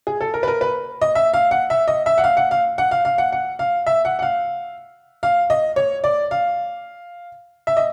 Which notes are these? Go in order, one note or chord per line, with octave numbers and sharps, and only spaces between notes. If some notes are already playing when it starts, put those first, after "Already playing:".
G#4
A4
A#4
B4
A#4
B4
D#5
E5
F5
F#5
E5
D#5
E5
F#5
F5
F#5
F5
F#5
F5
F5
F#5
F#5
F5
E5
F#5
F#5
F5
F5
D#5
C#5
D5
F5
E5
D#5